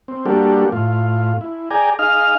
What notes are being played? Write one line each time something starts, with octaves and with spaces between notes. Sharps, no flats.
C4
G3 A#3 D4 F#4 G4 A4
A2 F4
E4
G#4 D5 G5 G#5 A#5
D#4 G#4 D#5 F5 F6